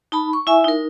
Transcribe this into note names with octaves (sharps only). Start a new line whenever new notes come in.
D#4 A5 B5
C#6
E4 E5 G#5
D#4 A#4